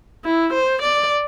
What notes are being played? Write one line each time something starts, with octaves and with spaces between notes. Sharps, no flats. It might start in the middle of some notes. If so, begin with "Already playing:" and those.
E4
C5
D5